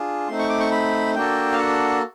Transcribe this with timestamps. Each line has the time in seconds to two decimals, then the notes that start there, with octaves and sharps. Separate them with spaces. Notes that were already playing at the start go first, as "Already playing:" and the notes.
Already playing: D4 F4 G#4
0.27 A3 C4 D#4 C6
0.39 C#6
0.49 D6
0.60 C#6
0.71 B5
1.15 A#3 D4 F#4 A4 G5
1.52 F5
1.58 F#5